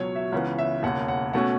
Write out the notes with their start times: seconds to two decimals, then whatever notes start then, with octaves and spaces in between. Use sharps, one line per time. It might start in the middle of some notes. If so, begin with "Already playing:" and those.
Already playing: C#2 B2 F#3 C#5
0.16 E5
0.32 C#2 C#3 E3 B3 F#5
0.58 E5
0.83 E1 D#2 C#3 F#5
1.08 F#5
1.33 B2 A3 C#4 F#5